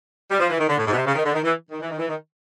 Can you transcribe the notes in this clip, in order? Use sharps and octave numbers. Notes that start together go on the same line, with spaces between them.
G3
F3
E3
D#3
D3
A2
G#2
B2
C3
C#3
D#3
D3
D#3
E3
D#3
E3
D#3
E3
D#3